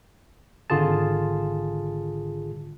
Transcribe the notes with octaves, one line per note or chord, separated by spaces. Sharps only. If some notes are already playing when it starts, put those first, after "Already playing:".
G#1 D3 F4 G#4 A5